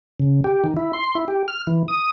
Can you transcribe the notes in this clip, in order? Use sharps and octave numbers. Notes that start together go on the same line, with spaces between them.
C#3
G4
D#3
E4
C6
E4
G4
F6
E3
D#6